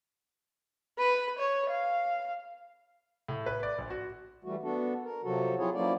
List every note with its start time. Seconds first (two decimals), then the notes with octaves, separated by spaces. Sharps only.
0.99 B4
1.39 C#5
1.70 F5
3.28 A2
3.46 B4
3.63 D5
3.78 A#1
3.90 F#4
4.44 E3 G3 A3 F#4
4.63 B3 D4 F#4 A4
5.04 A#4
5.24 C3 F3 F#3 F#4 A4
5.58 F#3 C4 E4 F4 G#4 C#5
5.75 F3 F#3 A#3 C#4 E4 D5